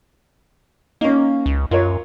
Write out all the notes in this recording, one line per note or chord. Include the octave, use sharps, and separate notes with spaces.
A#3 C#4 D#4
C#2
F#2 F4 A#4 C#5